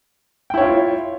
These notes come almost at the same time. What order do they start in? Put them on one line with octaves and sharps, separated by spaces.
G5 E4 C#5 F4